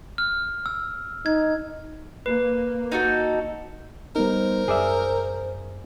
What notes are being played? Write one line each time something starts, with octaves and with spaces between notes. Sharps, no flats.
F6
E6
D#4 G#6
A#3 B4
D#4 F#4 A4
G3 B3 D#4 A#4 C5
F#2 G#4 D5 E5